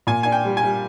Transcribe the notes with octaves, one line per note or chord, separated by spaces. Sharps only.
A#2 G#5
D4 G#5
G5
G3
G#5
G3